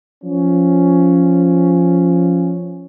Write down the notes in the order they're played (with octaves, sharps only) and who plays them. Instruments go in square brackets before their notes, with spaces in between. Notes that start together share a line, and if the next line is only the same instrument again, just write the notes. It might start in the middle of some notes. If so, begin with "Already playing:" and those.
[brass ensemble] F3 C#4